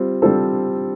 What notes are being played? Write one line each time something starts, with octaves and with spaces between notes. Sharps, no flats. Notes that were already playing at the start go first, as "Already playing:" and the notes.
Already playing: G3 C4 F4
G3 C4 F4 A4 C5